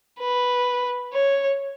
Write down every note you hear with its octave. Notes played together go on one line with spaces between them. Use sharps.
B4
C#5